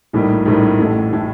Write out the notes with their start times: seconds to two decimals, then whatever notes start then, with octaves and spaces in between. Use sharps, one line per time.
0.13 A#1 A2 G3 A#3 D#4
0.46 A#1 A2 G3 A#3 D#4
0.79 A1 A2 A3
1.13 A2 A3